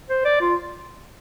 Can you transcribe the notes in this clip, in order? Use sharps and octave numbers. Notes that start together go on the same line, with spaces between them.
C5
D5
F4